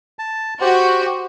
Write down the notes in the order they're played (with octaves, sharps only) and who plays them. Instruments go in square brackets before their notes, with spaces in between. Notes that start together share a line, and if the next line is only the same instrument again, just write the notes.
[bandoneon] A5
[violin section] F#4 [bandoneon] G4 [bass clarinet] C5